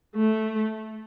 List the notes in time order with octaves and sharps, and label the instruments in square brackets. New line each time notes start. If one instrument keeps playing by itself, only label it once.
[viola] A3